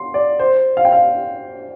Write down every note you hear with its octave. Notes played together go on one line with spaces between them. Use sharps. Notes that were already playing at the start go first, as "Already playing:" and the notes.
Already playing: C6
D5
C5
F5
G5
F5